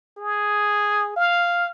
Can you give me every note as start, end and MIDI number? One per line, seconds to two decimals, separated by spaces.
0.18 1.13 68
1.16 1.69 77